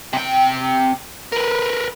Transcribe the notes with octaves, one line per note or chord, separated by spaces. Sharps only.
C3 G5
A#4 B4